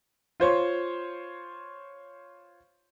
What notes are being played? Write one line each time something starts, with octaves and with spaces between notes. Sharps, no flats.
F4 C5 C#5